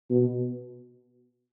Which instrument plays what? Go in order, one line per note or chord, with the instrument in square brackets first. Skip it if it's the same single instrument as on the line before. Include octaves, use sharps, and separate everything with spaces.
[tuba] B2